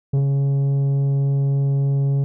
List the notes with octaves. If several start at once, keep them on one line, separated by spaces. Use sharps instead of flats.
C#3